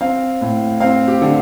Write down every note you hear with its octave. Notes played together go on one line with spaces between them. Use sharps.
C4 F5
A2
C4 F5
G4
D3